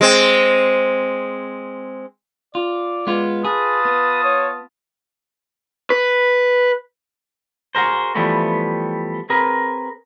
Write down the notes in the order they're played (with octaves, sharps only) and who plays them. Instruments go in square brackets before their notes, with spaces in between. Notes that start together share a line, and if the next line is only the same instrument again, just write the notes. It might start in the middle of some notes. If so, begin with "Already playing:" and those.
[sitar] G#3 C4
[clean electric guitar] F4 [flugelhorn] D5
[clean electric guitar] G#3 B3 F4
[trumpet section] F4 A5 D#6 [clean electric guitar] G#4 [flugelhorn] B4
[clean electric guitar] B3
[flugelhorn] C#5
[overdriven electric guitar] B4
[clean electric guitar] F#4 G#4 A#4 C5
E3 F3 G3 A3 B3
C4 G#4 A#4 B4